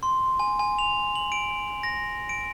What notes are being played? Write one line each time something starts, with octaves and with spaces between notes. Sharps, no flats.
C6
G#5
G#5
F7
F#7
D7
A#6
D7